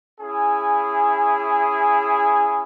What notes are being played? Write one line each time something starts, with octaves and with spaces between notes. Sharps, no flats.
C#4 E4 G#4 G#5